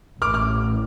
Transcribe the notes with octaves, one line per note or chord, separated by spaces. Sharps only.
A1 D6 F6
D6 F6